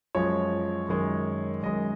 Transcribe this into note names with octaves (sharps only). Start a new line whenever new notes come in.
F#2 F3 G#3 C#5
F#2 D#3 G#3
F#2 D#3 G#3 D#5